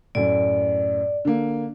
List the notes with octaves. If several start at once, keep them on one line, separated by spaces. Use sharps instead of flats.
F#2 A2 D5
D3 A#3